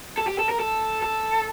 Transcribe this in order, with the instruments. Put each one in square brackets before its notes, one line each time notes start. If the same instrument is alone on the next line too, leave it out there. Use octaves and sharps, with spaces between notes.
[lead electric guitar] A4
G4
A4
A#4
A4
A4